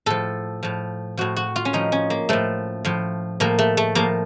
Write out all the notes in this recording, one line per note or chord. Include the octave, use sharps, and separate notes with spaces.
A2 F3 A4
A2 F3
A2 F3 F#4
F#4
F4
C#4
A2 F3 D#4
C#4
A#3
A2 F3 A3
A2 F3
A2 F3 A#3
A3
A3
A2 F3 A#3